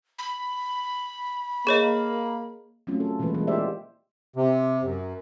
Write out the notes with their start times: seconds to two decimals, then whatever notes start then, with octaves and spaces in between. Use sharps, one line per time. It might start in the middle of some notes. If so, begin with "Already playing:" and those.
0.19 B5
1.67 A#3 G#4 C#5 D#5
2.87 F#3 A3 C4 C#4 F4
3.00 F3 A4
3.19 B2 E3 F3 G#3 A#3 B4
3.34 E3 G3 G#3 A#3
3.47 F4 G4 C5 D5 E5
4.36 C3
4.83 F#2